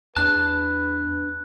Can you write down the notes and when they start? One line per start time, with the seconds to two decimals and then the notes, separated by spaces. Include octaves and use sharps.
0.16 E2 D4 B4 A5 F#6